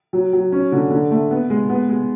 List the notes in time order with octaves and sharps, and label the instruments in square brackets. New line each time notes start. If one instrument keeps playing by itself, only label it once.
[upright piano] F#3
F#3
C#4
D3
D3
A3
B3
G#3
B3
G#3